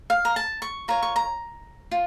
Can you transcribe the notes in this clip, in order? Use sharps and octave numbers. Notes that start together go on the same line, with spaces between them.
F5
A#5
A5
C#6
F4 A#4 C#5 A#5
C#6
A#5
F4